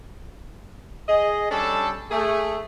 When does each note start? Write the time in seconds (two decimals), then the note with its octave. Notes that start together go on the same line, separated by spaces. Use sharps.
1.08 G#4 D#5
1.50 G3 C#4 D4 A4
2.10 A3 G#4